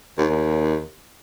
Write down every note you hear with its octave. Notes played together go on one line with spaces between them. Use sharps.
D#2